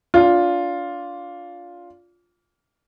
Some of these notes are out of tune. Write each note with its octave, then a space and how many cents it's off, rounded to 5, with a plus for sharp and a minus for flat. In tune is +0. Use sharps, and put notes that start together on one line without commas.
D4 -30 F4 +5